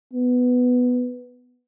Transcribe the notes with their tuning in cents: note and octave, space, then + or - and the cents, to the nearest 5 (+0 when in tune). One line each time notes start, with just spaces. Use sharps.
B3 +5